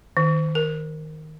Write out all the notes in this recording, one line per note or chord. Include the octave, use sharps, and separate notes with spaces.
D#3
A#4